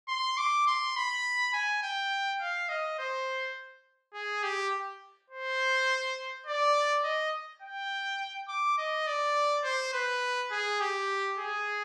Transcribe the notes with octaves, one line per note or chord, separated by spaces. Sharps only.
C6
D6
C6
B5
G#5
G5
F5
D#5
C5
G#4
G4
C5
D5
D#5
G5
D6
D#5
D5
C5
B4
G#4
G4
G#4